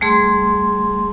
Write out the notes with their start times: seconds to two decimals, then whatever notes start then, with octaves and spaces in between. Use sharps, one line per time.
0.01 G3 A3 G#4 C6